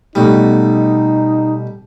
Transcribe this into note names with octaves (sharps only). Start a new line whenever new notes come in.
B2 G3 A3 D#4